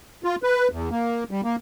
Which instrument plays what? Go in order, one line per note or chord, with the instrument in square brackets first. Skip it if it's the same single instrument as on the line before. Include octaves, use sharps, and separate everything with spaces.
[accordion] F4
B4
E2
A#3
G3
A#3